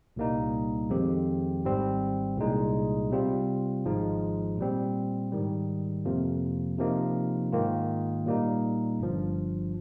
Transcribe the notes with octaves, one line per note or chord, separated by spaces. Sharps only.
C2 A#2 G3 A#3 D#4
F2 D#3 G#3 C4 G4
G#1 G#2 G3 C4
C2 A#2 G#3 D#4
C3 G3 C4 F4
G#1 G#2 F3 G#3 D#4
A#2 G3 C4
G#2 D#3 G3
F2 C3 F3 A#3
C3 F3 A#3 D#4
G#2 D#3 A#3 F4
A#2 G3 A#3 D#4
G1 G2 F3